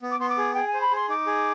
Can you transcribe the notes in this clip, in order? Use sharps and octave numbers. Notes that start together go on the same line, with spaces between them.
B3
D6
B3 C6
D6
G#4
G#4 G5
G#5
C5
B5
G#4 C6
D#4 D6
G#4